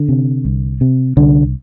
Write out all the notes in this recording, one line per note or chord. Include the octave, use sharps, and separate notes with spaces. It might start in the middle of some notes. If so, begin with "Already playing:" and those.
Already playing: D3
C3
C2
C3
C2 D3